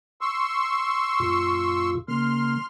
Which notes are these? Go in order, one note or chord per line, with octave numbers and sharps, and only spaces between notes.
C6 C#6 E6
F#2 A#2 F4
C#3 A#3 C6 F6